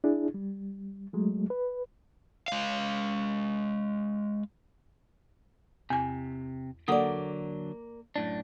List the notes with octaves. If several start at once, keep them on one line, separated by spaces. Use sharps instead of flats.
D4 E4 G#4
G3
F#3 G#3 A3
B4
G#3 F5
E2 C3 G#5
D3 F#3 A#3 A4 D5 F#5 D#6
F#2 A2 D4